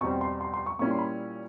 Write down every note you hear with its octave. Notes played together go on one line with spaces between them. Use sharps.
E2 B2 G3 C4 C#6
C6
C6
C6
C#6
A#2 G3 A#3 C#4 E4 C#6
C6
B5